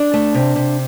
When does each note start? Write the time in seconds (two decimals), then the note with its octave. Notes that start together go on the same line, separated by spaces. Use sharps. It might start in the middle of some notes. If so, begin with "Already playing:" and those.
Already playing: D4
0.14 A3
0.34 C3
0.56 C3